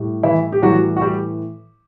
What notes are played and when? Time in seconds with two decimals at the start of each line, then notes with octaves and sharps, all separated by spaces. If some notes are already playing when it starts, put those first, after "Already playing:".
Already playing: A2 G3
0.23 E3 E4
0.52 G4
0.62 A2 E3 F#3 G3 F#4
0.97 F#4
1.01 G3 G4